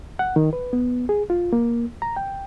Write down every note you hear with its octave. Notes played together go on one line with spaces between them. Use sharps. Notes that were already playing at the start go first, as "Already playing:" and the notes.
F#5
D#3
B4
B3
G#4
F4
A#3
A#5
G5